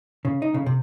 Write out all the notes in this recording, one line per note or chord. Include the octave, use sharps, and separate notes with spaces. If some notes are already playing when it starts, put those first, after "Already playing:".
C#3
D#4
C#3
C3